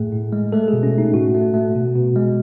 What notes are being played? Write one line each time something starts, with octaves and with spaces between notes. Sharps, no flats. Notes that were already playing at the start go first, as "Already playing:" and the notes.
Already playing: A2 A3 G#4
A2
G#3
A3 A4
G#4
B2
C#4
A3 D#4
A2 F#4
A3
A3
B2
B2
G#3